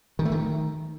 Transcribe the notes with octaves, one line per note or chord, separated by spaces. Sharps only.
D#3
A3
D#3